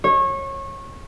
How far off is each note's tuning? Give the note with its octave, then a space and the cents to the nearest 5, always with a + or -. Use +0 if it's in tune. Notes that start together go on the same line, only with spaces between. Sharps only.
C#5 -25